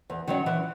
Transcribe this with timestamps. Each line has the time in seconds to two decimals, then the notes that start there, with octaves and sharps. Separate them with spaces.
0.10 E2
0.28 D#3 F#3 C#4
0.46 E3